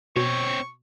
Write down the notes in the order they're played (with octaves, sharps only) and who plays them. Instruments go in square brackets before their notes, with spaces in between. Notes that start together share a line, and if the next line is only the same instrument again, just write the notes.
[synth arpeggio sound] B2 [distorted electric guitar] C4 C#5 [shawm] C#6